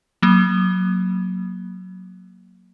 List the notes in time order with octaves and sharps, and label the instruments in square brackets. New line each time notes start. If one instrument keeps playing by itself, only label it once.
[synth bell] F#3 A#3